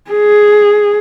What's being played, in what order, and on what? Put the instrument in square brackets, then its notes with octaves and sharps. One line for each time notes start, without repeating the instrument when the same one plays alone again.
[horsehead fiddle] G#4